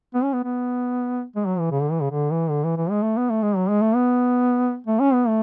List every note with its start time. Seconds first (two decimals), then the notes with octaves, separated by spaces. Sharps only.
0.14 B3
0.24 C#4
0.33 B3
0.44 B3
1.36 G#3
1.45 F#3
1.59 E3
1.71 C#3
1.81 D3
1.92 E3
2.01 C#3
2.11 D3
2.31 E3
2.50 D3
2.64 E3
2.77 E3
2.90 G#3
3.03 A3
3.17 B3
3.30 A3
3.43 G#3
3.56 F#3
3.69 G#3
3.82 A3
3.95 B3
4.87 A3
5.00 C#4
5.13 B3
5.27 A3